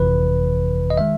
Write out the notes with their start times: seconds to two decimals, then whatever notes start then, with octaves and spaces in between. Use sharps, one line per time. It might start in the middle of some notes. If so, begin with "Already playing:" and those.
Already playing: G1 F2 C3 E3 B4
0.90 D#5
0.98 D#3 G#3 E5